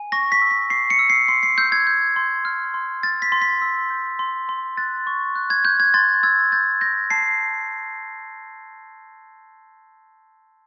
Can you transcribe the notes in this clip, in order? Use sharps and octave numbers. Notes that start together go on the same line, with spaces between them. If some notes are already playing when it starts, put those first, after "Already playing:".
Already playing: G#5
C#6 A#6
B6
E6
B6
C#6 C7
C#7
E6
C7
C6 C7
C7
E6 G6
G#6
G6
C6
F6
C6
F6 A6
B6
C6
B6
E6
G6
C6
C6
F#6 A6
C#6
F#6
G#6
F#6 G6
G#6
C6 A6
E6 G#6
G6 A6
G6 A#6
A5 C7